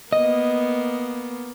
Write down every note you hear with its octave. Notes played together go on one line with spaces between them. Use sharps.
A#3 B3 D#5